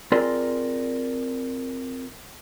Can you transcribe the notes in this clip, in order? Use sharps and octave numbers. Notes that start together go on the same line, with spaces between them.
C4 F4 G#4 A#4 D5 C6